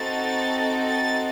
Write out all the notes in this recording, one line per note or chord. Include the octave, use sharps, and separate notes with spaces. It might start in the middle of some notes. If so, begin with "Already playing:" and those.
Already playing: C4 D#4 F#4 A4 A6
A6